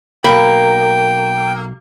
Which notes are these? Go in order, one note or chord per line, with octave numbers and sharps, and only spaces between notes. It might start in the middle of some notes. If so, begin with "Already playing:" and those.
B1 G2 A#3 G5 B5